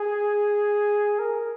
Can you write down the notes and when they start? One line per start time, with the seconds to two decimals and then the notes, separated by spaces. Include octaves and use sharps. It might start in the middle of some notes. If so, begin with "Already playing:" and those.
Already playing: G#4
1.19 A#4